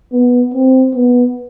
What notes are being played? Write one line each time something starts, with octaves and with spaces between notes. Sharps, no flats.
B3
C4
B3